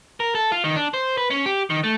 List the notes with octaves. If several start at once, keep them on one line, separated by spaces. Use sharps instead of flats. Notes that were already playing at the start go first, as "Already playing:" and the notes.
A#4
A4
F4
D#3
D4
C5
B4
C#4
G4
D#3
A3